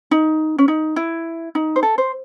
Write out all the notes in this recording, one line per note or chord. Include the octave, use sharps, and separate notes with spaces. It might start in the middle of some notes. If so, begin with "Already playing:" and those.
D#4
C#4
D#4
E4
D#4
C5
A4
C5